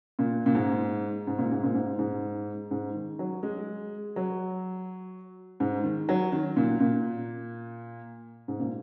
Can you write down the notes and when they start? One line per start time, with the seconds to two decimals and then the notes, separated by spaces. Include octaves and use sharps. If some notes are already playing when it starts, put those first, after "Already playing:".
0.19 A#2
0.46 A#2
0.55 G#2
1.27 G#2
1.39 A#2
1.51 G#2
1.63 A#2
1.74 G#2
1.99 G#2
2.71 G#2
2.95 D#3
3.19 F#3
3.43 G#3
4.16 F#3
5.60 G#2
5.84 D#3
6.09 F#3
6.32 D#3
6.56 A#2
6.80 A#2
8.48 G#2
8.59 A#2